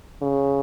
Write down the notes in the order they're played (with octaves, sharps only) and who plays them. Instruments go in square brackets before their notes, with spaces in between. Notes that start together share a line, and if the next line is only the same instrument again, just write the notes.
[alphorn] C#3